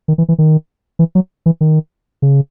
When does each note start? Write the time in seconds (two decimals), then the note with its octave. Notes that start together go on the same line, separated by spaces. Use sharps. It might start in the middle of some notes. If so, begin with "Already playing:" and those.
0.08 D#3
0.18 E3
0.29 E3
0.38 D#3
0.99 E3
1.15 F#3
1.46 E3
1.61 D#3
2.22 C#3